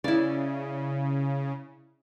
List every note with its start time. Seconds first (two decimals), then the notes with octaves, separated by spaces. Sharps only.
0.04 C#3 E4 D5